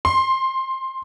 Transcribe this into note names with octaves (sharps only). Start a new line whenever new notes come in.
C6